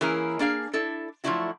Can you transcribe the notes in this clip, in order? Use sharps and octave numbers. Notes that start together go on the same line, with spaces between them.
E3 A#3 C#4 E4 G#4 A#4
A#3 D4 G#4 F5
D4 E4 A4
F3 F#3 A3 D4 E4 F#4